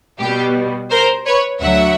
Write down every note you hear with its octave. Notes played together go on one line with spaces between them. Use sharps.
B2 G3 B3 G4
A#4 C5
B4 C#5
D2 D3 F#3 E5 F#5